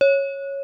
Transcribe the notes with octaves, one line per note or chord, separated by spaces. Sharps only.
C#5